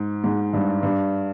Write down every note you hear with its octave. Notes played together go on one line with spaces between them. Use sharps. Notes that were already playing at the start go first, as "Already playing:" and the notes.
Already playing: G#2
G#2
G2
G2